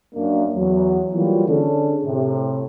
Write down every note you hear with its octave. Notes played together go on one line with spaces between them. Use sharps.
F#2 A#3 D4
E2 F#3
E3 F#3 G3 A#3 F4
D3 C#4 D4 G#4 A4
A2 C3